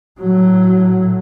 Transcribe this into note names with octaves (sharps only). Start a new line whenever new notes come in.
A2 F#3